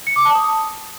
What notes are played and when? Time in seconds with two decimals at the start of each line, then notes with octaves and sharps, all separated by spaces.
0.07 C#7
0.16 D6
0.25 A5
0.35 D#6